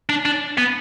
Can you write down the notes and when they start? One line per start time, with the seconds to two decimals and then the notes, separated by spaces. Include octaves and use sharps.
0.09 D4
0.26 D4
0.58 B3